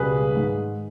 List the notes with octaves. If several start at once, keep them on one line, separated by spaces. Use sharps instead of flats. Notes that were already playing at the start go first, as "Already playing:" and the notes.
Already playing: C#2 B2 G3 G#4 B4
G#2 D#3 G#3